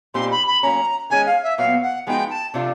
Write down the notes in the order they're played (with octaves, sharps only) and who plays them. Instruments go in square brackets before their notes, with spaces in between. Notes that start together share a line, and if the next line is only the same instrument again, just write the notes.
[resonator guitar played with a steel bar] A#2 G3 C4 D#4 G4 [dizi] C6
[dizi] B5
B5
[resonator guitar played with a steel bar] F#3 A#3 C#4 [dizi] A#5
[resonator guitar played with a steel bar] D#3 G#3 C#4 [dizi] G#5
[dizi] F5
E5
[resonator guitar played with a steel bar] A#2 F#3 B3 [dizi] F5
[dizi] F#5
[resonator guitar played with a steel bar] F3 G#3 B3 D#4 F#4 [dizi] G5
[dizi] A5
[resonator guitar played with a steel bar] C3 F3 A3 D4 F4